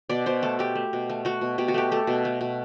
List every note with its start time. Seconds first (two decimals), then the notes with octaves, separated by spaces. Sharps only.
0.09 B2 D5
0.26 B2 C5
0.43 A3 A4
0.59 A3 G4
0.75 A3
0.93 B2
1.10 A3
1.25 A3 F#4
1.41 B2
1.58 B2 G4
1.68 F#4
1.74 A3 G4
1.91 A3 A4
2.07 B2
2.25 A3
2.41 B2